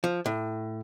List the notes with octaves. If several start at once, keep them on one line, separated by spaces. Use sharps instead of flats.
F3
A2